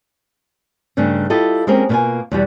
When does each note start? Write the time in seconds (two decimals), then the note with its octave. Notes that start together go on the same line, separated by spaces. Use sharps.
0.97 G2 C#3 A3 D4 D#4
1.30 E4 F4 G4 A4 D#5
1.67 G#3 A#3 C4 C#4 G4 A#4
1.89 B2 A#3 C#4 F4 A#4 G#5
2.32 E2 B2 G3